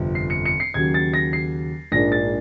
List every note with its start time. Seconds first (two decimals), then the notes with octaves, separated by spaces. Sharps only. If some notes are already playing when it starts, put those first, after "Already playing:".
Already playing: G1 F2 C3 F3
0.15 C7
0.30 C#7
0.45 C#7
0.60 C7
0.74 D#2 C#3 F#3 G#6
0.94 A6
1.14 A#6
1.33 C7
1.92 A#1 G#2 F3 A#3 D4 A#6
2.12 A6